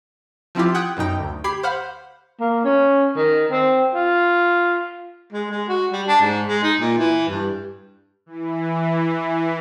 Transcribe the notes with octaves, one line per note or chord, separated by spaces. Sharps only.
F3 C4 E4 F4 G4
F#5 G5 D#6 F#6 G#6
F#2 B2 D#4 G5
D2
G4 B5 G#6 C7
C5 F5 F#5 B5
A#3
C#4
D#3
C4
F4
G#3
G#3
F#4
G3
D4
G#2
G#3
D#4
A#2
E3
G2
E3